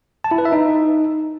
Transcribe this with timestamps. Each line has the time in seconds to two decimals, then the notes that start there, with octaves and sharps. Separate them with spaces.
0.24 A5
0.31 E4
0.38 B4
0.45 E5
0.52 D#4